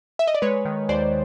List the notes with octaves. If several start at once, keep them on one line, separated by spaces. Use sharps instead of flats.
E5
D#5
D5
G#3 B4 C#5
D#3
D#2 C5 D5